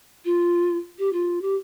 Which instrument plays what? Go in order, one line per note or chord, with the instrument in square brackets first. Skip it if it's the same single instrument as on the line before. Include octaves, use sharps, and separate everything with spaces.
[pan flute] F4
G4
F4
G4